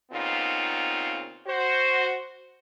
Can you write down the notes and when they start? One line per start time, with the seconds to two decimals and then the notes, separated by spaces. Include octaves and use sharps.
0.12 A#2 C#3 B3 C4 D#4 F4
1.47 F#4 C5